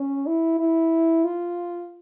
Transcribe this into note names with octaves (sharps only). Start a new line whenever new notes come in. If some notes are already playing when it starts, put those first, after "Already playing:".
Already playing: C#4
E4
E4
F4